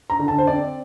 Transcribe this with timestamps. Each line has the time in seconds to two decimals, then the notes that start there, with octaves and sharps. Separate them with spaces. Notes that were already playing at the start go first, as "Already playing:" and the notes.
0.10 A#5
0.19 D3
0.28 A5
0.38 C5
0.47 C4 D5